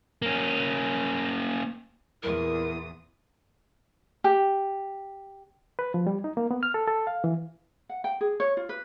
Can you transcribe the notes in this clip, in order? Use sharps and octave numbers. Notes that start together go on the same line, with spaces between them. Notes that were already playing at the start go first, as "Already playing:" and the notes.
A#3 C#4
E2 A#2 E4 A#4 D#6
G4
B4
F3
G3
D#4
A#3
B3
F6
A4
A4
F5
E3
F#5
G5
G#4
C#5
F4
B4